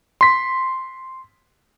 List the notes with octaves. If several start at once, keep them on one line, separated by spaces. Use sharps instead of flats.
C6 B6